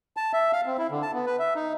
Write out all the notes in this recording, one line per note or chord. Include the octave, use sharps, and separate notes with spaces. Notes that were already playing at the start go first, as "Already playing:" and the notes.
A5
E5
F5
C4
E4
D3
A5
B3
B4
E5
D#4